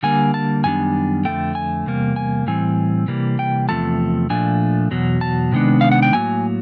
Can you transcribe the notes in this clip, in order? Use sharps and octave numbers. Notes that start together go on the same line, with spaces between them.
D3 G3 A#3 G#5
A5
F#2 D#3 G3 B3 D4 G#5
F2 D3 F3 A3 G5
G#5
E2 C3 G3 A#3
G#5
A2 E3 G3 C4 G#5
C3 E3 G3 A#3
G5
E2 C3 F3 A3 A5
A#2 F3 A3 D4 G#5
E2 B2 F#3
A5
C3 D#3 G#3 B3 D4
F5
F#5
G5
A2 F#3 A#3 G#5